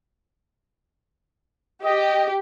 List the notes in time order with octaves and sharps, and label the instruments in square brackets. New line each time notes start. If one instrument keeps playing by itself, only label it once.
[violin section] G4 [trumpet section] D#5